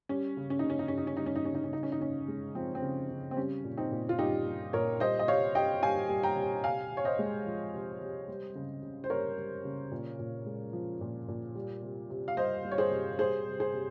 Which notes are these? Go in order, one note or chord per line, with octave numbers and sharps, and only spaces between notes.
G3 C#4
C#3
C#4
D#4
C#3
C#4
D#4
G3 C#4
D#4
C#4
G3 D#4
C#4
D#4
C#3 C#4
D#4
C#4
C#3 D#4
C#4
D#4
C#3 C#4
G#3
F3 C4
C4
C#3
C#3
C4
G3 C#4
A#2
C4 D#4
A#2
F4
G3 D#4 G4
G3
A#2 A#4 C#5
G3 C5 D#5
D#5
C3 C#5 F5
C3 D#5 G5
G3 F5 G#5
G3
G5 A#5
C3
C3 F5 G#5
C3
C#5
C5 D#5
G#3
F3
C3
C3
G3
C#3
C#3
C5
G3 A#4 C#5
G3
C#3
A#2
A#2
G#3
F3
A#2
A#2
G3
C3
C3
F5
G3 C5 D#5
G3
C#5
G#4 C5
C3
G3 G#4 C5
C3
G#4 C5
C3